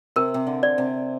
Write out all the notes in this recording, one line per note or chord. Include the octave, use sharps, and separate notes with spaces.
C3 A#4
C3
D3
D5
C3